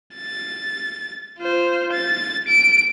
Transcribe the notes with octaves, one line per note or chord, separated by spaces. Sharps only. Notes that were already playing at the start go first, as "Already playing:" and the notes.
A6
F4 C5
A6
D7